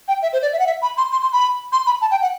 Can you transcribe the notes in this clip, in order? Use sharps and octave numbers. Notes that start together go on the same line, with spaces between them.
G5
E5
C5
D5
E5
F#5
E5
B5
C6
C6
C6
B5
C6
B5
A5
G5
F#5